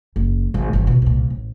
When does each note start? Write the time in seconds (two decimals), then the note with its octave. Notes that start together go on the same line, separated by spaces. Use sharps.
0.16 F#1
0.54 G#1
0.73 G1 D#3
0.87 C#2 B2
1.02 C2 A#2
1.30 A1